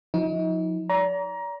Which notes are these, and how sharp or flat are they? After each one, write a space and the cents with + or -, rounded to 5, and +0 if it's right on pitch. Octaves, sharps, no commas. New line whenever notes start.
F3 +35 D#4 +40
D5 -40 A#5 +20